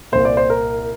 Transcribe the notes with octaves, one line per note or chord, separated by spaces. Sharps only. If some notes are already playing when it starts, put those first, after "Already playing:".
C2 A#2 C5
D5
C5
A#4